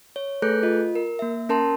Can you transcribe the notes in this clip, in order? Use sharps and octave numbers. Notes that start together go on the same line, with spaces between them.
C#5
A3 G#4 A4 B4 F#6 G6
F4 D#5
A#4
A#3 E5
C#4 A#4 A5 C6